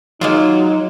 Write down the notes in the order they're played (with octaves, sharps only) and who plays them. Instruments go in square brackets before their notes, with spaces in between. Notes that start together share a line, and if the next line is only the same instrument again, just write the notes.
[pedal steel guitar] F#3 [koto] G#3 A#3 F4 [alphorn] D#4